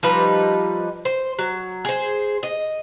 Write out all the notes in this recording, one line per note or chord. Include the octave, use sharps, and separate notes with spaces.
F3 G3 D#4 B4
C5
F#3
G#4 C5
D#5